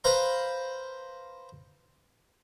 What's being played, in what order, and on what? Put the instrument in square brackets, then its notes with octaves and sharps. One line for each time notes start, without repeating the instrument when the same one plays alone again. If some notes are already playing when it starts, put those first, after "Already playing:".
[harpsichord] B4 C5 F5 A#5